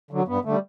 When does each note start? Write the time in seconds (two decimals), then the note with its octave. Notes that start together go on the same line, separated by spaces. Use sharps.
0.11 D3 F#3
0.28 G2 B3
0.45 D3 G3 A3